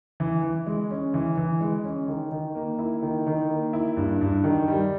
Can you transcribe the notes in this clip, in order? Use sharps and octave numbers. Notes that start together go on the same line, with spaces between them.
E3
E3
G#3
C#4
E3
E3
G#3
C#4
D#3
D#3
A#3
E4
D#3
D#3
A#3
E4
G2
G2
D#3
G3